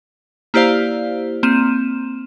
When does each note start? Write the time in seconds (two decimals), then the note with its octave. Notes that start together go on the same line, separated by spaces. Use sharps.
0.54 A#3 E4 G4 C5 D5 F5
1.43 A#3 C4 D#7 E7